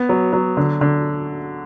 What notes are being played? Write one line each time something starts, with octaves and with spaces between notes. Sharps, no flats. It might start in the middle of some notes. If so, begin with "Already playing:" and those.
Already playing: B3
F#3
F#3
D3
D3